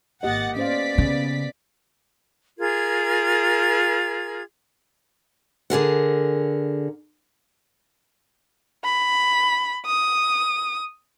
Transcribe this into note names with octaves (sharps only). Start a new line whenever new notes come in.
G#1 A#3 G4 D#5 F#5 A6
B3 C#4 C5 D5 F5 B6
C#3
F4 G#4 A#4 G#6
D3 G#4 A#4 F#5
B5
D#6